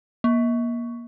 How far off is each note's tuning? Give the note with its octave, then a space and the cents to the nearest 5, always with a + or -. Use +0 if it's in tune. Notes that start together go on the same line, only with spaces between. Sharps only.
A#3 +30